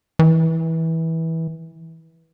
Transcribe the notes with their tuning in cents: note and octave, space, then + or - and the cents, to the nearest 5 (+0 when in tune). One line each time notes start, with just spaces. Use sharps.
E3 -20